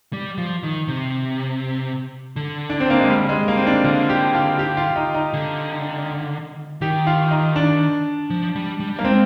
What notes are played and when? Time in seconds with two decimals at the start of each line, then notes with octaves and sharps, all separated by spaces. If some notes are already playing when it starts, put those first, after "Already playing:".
0.13 G3
0.38 F3
0.63 D#3
0.88 C3
2.36 D3
2.70 D4
2.80 C4
2.90 A#3
3.00 G#3
3.10 G3
3.29 G#3
3.48 A#3
3.57 C4
3.67 D4
3.84 D3 F4
4.09 G4
4.34 F4
4.59 G4
4.77 F4
4.96 D#4
5.14 D#4
5.33 D3
6.81 D#3 G4
7.07 F4
7.31 D#4
7.56 D4
8.30 F3
8.55 G3
8.80 G3
8.99 A#3
9.04 G#3 C4